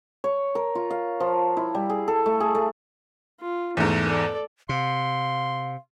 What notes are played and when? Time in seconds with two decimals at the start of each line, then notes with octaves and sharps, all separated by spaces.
0.24 C#5
0.55 A#4
0.75 F4
0.90 F5
1.20 F3
1.57 E4
1.75 G3
1.90 G#4
2.08 A4
2.26 A3
2.40 G#4
2.55 A3
3.40 F4
3.77 E2 G#2 A3
4.08 A4 D5
4.69 C3 F5 C6